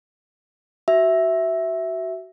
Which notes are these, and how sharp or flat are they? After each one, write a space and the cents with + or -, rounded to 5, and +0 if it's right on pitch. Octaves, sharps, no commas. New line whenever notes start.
F#4 +20 E5 +0